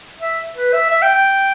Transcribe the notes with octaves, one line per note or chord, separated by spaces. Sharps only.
E5
B4
E5
E5
G5
G5